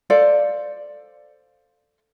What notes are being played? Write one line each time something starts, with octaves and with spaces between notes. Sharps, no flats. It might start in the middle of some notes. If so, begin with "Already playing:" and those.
A4 C5 D5 F5